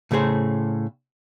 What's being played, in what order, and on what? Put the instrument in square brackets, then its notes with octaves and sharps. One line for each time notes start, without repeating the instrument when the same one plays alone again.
[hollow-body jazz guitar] A2 C#3 A3 G#4 C5